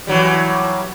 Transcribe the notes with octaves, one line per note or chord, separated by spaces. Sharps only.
E3 F#3 G3